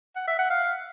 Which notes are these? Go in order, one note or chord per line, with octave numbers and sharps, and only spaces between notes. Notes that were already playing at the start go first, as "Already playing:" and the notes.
F#5
E5
F#5
F5